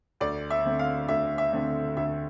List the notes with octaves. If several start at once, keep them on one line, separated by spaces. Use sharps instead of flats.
D2 D5
E5
D3 A3 C4
F5
D2 E5
E5
D3 A3 C4
D2 E5